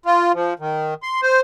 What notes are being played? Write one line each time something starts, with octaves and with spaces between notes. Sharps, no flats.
F4
F3
D#3
C6
C5